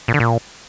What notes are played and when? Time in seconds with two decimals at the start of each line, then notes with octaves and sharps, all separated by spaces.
0.08 A#2
0.14 D3
0.20 A#2